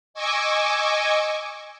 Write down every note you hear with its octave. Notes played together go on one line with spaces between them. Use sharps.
D#5 G#5 C#6 D6 E6